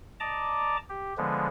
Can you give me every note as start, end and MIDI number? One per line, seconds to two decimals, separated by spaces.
0.20 0.77 74
0.20 0.77 75
0.20 0.77 81
0.20 0.77 82
0.20 0.77 86
0.89 1.14 67
1.18 1.48 50
1.18 1.48 53
1.18 1.48 56
1.18 1.48 59